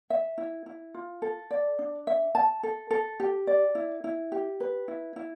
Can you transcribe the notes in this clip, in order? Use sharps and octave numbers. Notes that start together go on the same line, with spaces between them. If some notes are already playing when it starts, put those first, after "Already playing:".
E5
E4
E4
F4
A4
D5
D4
E5
A5
A4
A4
G4
D5
E4
E4
G4
B4
E4
E4